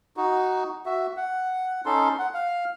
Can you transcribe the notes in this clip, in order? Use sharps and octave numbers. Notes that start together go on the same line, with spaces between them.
D#4 F#4
F#4 E5
F#5
C#4 D#4 A4 C6
F#5
F5